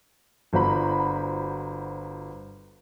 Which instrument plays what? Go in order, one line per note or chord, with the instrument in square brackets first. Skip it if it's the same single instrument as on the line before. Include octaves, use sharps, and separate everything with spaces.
[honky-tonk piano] G1 F#4 C5 A#5 B5